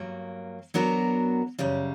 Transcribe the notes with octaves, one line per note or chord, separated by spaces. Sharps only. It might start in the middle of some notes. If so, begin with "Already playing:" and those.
Already playing: G2 F#3 A#3
F#3 B3 D4 F#4 A#4
F#2 C#3 G3